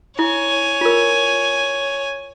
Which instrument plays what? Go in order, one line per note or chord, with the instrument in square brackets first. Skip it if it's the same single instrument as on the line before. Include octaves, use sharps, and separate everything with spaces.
[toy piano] E4 [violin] C#5 G#5
[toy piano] F4 A#4